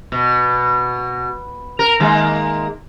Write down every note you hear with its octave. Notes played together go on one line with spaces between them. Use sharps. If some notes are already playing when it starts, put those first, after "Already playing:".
B2
A#4
D#3 G#3 A#3